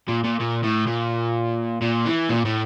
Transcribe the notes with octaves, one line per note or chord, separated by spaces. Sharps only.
A#2
A#2
A#2
A2
A#2
A#2
E3
A#2
A2